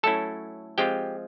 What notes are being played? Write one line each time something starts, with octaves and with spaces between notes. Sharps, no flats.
F#3 A3 C#4 E4 A4 A5
F3 G#3 C4 F4 G4 G5